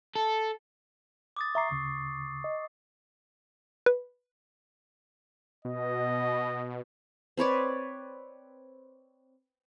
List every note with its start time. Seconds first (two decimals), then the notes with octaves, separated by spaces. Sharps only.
0.16 A4
1.37 D6 D#6 A6
1.55 E5 A#5 C#6 D6 C7
1.71 D2 C#3
2.44 D#5
3.86 B4
5.65 B2 D#5
7.37 C4 B4 C#5 D5